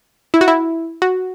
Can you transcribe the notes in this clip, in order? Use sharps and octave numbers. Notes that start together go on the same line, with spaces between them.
E4
F#4
E4
F#4